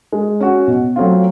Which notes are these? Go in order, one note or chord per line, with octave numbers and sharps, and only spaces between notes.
G#3
C#4 F#4
B2
F#3 A3 C4 F4